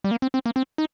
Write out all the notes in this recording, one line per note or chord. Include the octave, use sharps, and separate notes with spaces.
G3
A#3
C4
C4
A#3
C4
D#4